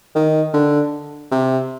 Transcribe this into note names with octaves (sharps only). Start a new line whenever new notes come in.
D#3
D3
C3